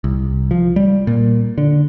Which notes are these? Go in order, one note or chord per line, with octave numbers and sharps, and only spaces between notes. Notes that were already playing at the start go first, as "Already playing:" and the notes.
C2
F3
G3
A#2
D3